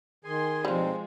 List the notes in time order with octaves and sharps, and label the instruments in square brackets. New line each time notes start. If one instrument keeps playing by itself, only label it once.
[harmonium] D#3 [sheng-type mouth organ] G#4 G#5 [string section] C6
[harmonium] B2 C4 D#4 [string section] F3 G#3 [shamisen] G3 F4 [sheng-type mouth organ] C5